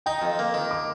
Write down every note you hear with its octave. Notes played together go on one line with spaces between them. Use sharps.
D#4 G5
F2
A#3
D#3
D6